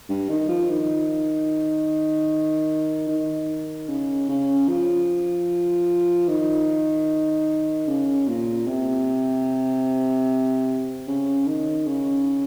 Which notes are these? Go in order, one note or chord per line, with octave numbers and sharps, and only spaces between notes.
G2
D#3
F3
D#3
D#3
C#3
C#3
F3
D#3
C#3
A#2
C3
C#3
D#3
C#3